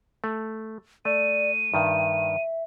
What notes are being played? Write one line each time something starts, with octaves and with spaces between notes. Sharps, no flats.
A3
A3 D5 D#7
G2 D#3 E5